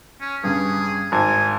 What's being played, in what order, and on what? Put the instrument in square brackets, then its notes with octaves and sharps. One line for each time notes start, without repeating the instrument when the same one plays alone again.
[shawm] C#4
[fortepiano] G2 C#3 [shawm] G#4
[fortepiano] G#1 [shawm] G#5